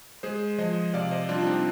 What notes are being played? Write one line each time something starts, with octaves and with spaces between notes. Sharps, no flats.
G#3 G#4 C5
F3 C5 D#5
C3 D5 F5
C5 D#5
G3 D4 F4
D4
C4 D#4